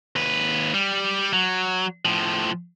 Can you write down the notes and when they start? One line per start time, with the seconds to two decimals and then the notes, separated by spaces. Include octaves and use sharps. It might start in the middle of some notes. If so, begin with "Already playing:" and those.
0.16 D#2 B4
0.74 G3
1.33 F#3
2.05 A2 F3